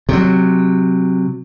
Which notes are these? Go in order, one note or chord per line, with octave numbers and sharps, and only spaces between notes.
C3 F#3